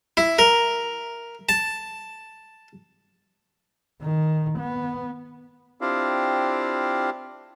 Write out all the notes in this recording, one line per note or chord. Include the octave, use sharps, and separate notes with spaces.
E4
A#4
A5
D#3
B3
C4 D4 E4 F4 G4 F5